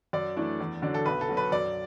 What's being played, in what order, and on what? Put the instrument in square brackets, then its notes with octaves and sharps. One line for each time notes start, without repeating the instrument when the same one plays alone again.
[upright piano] F#2 D5
E3 A3 D4
E2
D3 F#3 D4
A4
B1 B4
A4
B2 F#3
B4
F#2 D5